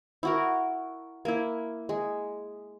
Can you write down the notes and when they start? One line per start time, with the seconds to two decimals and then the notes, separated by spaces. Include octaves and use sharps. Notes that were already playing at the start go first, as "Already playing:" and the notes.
0.23 E4 F#4 A#4
1.25 A#3 E4
1.89 G#3